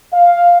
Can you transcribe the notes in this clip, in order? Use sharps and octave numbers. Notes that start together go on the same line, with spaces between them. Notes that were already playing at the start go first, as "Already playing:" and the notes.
F5